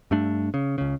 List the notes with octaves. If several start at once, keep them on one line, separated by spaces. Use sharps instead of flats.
G2 A3 D4
C#3
C#2 C#3